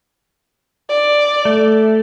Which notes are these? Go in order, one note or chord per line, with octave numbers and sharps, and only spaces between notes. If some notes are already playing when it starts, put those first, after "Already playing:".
D5
A3